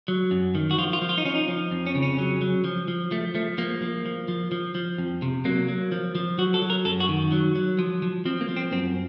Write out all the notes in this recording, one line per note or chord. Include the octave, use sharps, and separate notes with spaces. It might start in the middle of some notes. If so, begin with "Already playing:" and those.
F#3
F#2
D#3
F#4
F3 F4
F4
F3
F4
D#4
F3 C#4
D#4
F3
F2
C#4
C#3
C#4
F#3
F#3
F3
F3
F3 A3
F3 A3
F3 A#3
F3
F3
F3
F3
F3
F2
C3
F#3 A#3
F#3
F3
F3
F#3 F#4
A4
F#3
A#4
F#2 A4
F#4
D#3
F#3
F#3
F3
F3
F3 C4
A#3
F3
C4
F#2 C4